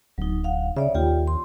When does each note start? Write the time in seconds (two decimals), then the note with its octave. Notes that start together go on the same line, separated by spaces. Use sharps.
0.18 D1 F#3 D#4
0.44 F5 F#5
0.76 C#3 C#5 D5 E5
0.95 D#2 F4 G4 G5
1.28 C6